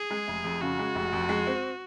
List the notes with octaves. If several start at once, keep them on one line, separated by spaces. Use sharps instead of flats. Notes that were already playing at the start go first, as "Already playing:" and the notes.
Already playing: G#4
G#3
F1
F2
C#3 F#4
G#3
F1
F2
G#3
C4